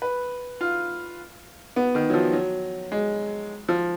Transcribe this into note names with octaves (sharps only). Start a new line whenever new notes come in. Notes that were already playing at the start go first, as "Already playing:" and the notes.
B4
F4
B3
D#3
F#3
F3
F#3
G#3
F3